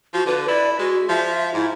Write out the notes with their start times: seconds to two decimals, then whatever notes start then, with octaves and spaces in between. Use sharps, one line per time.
0.14 F3 F#4
0.26 D3 B4
0.48 E4 D5
0.79 G#3 F#4
1.09 F3 E5
1.54 G#2 E4